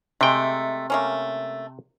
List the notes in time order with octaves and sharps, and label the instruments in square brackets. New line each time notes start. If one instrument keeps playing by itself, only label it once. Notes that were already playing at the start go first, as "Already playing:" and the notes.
[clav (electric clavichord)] C3 G5 [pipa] G#3 A3
[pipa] A3 A#3 C#4